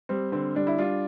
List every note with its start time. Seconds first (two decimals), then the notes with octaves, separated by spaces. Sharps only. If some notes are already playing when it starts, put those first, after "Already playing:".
0.09 G3 C4
0.32 D3 C4
0.55 G3 D4
0.67 E4
0.78 G3 D4 F4